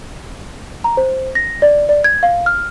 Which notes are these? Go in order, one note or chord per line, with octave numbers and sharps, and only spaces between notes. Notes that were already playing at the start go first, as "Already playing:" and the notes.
A#5
C5
A#6
D5
D5
G#6
F5
F6